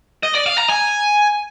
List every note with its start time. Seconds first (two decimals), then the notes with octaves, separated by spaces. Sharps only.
0.23 D#5
0.35 D5
0.46 F5
0.58 A#5
0.69 G#5